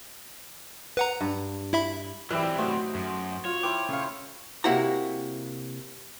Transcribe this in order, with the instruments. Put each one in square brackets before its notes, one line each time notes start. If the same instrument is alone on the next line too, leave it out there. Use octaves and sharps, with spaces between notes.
[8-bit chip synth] B4 F#5 A#5
[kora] G2
[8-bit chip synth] E4 E5 B5
[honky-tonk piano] E3 [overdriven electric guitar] F#3 C4 [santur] G3 E4 E5
[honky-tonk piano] A3 [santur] D#4 F#4 C5
[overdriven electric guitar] F#2
[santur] F4 [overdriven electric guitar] C#5
[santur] E4 C5 G5 [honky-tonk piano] D6
[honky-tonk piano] C#3 F5 [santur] A3
[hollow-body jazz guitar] C3 A#3 E4 F#4 A#5